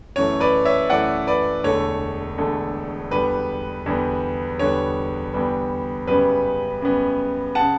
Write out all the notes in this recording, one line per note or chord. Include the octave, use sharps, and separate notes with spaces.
F#2 E3 A3 C#5
B4 D5
C#5 E5
F#2 E3 A3 D5 F#5
B4 D5
E1 E2 D3 A3 C#5
E1 E2 D3 A3
E2 D3 G3 B3 B4
E2 D3 G3 B3
E2 D3 G3 B3 C#5
E2 D3 G3 B3
F#2 C#3 G3 B3 B4
F#2 C#3 G3 B3
C#3 F#5 A5